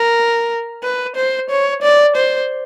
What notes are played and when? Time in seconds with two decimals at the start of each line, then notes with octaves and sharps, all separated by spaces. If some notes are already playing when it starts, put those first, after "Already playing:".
Already playing: A#4
0.83 B4
1.16 C5
1.50 C#5
1.83 D5
2.16 C5